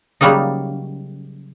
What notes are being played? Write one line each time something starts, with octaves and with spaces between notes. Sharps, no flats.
C#3 F#3 G3 A#3 D#4